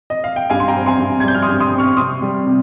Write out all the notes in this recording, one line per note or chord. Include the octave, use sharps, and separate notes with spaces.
D#5
F5
G5
G2 F5 G#5
C6
G5 A#5
C4
G#5 C6
G2
G#6
G3 G6
F6
C6 D#6
G2
C6 D#6
C4
C#6 F6
C3 C6 D#6
G3
C3